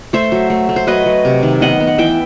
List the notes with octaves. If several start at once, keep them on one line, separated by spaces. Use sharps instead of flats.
A3 C5 E5
F#3
A3
A3
C5
F#3 B4 D#5
F#3
C3
D#3
B3 D#5 F#5
B3
F#5
E3 E5 G5